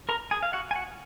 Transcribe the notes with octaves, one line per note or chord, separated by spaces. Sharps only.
A#4 A#5
G#4 G#5
F5
F#4 F#5
G#5
F#4 F#5